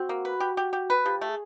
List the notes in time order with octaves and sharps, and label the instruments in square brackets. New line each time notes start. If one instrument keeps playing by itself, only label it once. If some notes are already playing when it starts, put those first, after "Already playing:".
Already playing: [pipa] C4 [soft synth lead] F#4
[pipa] A#3
B4
G4
G4
G4
B4
[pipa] F3 [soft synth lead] G4
[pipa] A3
[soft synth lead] G#4